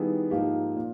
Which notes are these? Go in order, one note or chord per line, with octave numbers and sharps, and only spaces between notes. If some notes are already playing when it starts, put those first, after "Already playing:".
Already playing: D#3 G3 B3 E4 G#4
G#2 F3 A#3 D#4 G4
A#2